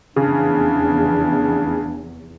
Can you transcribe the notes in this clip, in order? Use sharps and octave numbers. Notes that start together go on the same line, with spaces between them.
F1 E2 C#3 D4